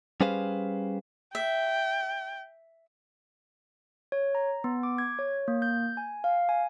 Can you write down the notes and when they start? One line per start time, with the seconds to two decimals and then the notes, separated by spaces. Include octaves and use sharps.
0.21 G3 C#4 G#4 B4 C5 F5
1.35 E5 G5
4.12 C#5
4.35 A#5
4.64 B3
4.83 D6
4.98 G#6
5.19 C#5
5.48 A#3
5.62 G6
5.97 G#5
6.24 F5
6.49 G#5